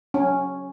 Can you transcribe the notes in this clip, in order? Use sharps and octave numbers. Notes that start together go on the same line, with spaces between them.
C#4